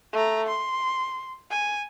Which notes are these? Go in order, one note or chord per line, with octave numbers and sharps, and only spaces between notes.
A3 A#5
C6
G#5